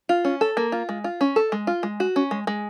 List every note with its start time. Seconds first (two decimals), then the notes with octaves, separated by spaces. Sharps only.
0.09 F4
0.25 C#4
0.41 A4
0.57 A#3
0.72 F4
0.89 G#3
1.04 F4
1.21 C#4
1.36 A4
1.52 G#3
1.67 F4
1.83 G#3
2.00 F#4
2.16 C#4
2.31 G#3
2.47 G#3